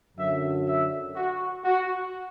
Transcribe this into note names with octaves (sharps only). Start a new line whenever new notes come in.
F#2 D3 F#3 E5
E5
F#4
F#4